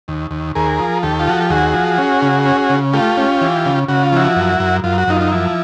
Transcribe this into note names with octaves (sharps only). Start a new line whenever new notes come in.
D#2
D#2
D#2 G#4 A#4
F3
D#2 G4 A4
F4
F3 F#4
G4
D#2 F#4 G#4
F3
C#4
C#3
C#4
C#3
A3 F4 G4
C#4
E3
C#3
C#3 F#4
F4
F3 E4 F#4
F#2
F#2
F#2 F4
F#4
F#2 D#4 F4
D#4
F3 E4